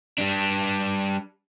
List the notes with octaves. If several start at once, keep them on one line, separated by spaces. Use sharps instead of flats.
G3 D4